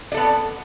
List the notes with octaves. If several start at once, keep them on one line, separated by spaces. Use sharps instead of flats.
B3 A4 D5